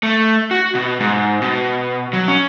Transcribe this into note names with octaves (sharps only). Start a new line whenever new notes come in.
A3
F#4
B2
G#2
B2
F#3
C#4